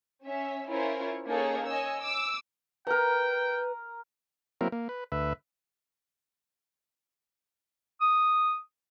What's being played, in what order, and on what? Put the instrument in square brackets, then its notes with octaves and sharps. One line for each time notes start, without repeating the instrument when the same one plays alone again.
[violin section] C#4 E5
C#4 E4 F4 A#4 C5 C#5
A#3 C#4 D#4 G#4 A4 C#5
C#5 D#5 G#5 E6
D6 E6
[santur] A#4 A#5 [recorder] B4 [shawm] G5
[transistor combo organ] F#3 A#3 C4 E4 A#4
A#3
B4
D2 B4 E5
[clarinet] D#6